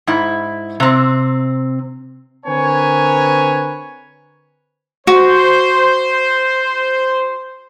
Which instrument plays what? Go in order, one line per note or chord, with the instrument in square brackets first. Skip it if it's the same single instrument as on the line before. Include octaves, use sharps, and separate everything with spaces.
[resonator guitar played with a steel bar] G#2 E4
C3 C4
[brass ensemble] D3 C4 A#4 B4 C#5 G#5
[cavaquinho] F#4 [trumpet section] C5